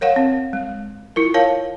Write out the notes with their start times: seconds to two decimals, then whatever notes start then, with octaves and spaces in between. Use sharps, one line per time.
0.01 A#4 C#5 F5 F#5
0.16 C4
0.53 G#3
1.16 E4 F4 A#4
1.34 A#4 C#5 F5 A5